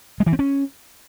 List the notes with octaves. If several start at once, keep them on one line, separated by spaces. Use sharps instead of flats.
G#3
E3
C4
C#4